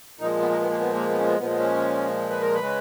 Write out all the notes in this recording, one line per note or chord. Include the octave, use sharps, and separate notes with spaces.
A#2 F3 G#3 D#4
B3
A#3
B3
A#3
B3
A#3
B3
C#4
B3
A#2 F3 G#3 B3
B3
C#4
B4
A#4
B4
C#3 G#3